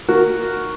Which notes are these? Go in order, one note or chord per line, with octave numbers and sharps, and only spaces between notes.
D#3 A#3 F#4 A#4